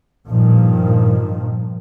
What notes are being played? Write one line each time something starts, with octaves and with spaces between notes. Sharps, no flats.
G2 A#2 D#3 F3